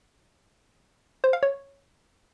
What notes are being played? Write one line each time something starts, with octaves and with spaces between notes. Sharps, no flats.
C5
F5
C#5